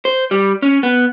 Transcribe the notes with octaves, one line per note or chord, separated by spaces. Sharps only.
C5
G3
C#4
B3